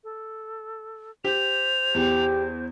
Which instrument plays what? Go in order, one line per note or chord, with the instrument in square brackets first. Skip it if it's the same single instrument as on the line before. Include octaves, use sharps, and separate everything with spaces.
[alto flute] A4
[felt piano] G4 [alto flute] C5 [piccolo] F7
[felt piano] E2 [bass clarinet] G4